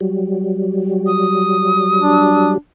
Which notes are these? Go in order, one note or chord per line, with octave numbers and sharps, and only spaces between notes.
F#3 G3
D#6
D4